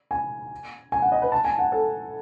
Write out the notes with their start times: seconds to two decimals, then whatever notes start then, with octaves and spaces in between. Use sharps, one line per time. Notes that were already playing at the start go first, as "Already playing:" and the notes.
0.11 G#5
0.92 G#5
1.02 F#5
1.12 D#5
1.22 B4
1.32 A5
1.45 G#5
1.59 F#5
1.72 A4